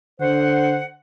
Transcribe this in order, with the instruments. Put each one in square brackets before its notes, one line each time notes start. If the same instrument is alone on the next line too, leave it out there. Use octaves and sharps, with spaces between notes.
[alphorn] D3 [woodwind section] C5 F#5